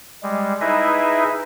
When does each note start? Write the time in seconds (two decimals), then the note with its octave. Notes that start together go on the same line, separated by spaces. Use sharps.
0.23 G3 G#3
0.61 D#4 E4 G#4 B4 D#5 E5